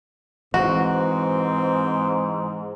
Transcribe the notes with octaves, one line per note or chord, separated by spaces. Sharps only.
G#2 E3 C4 F#4